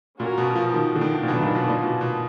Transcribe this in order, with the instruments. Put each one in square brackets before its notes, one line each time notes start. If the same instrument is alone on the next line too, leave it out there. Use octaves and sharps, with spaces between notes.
[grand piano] A#2 [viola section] C#4 F#4 A#4
[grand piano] B2
F3
D#3
D3
D#3
A#2
[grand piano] B2 [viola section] D#3 F#3 B3 D4
[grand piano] A#2
B2
A#2
B2
B2